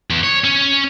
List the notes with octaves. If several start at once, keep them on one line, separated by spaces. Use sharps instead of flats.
E2
C#5
C#4